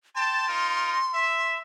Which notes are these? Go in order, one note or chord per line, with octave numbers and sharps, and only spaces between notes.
G5 A5 C6
D#4 F4 A#4
E5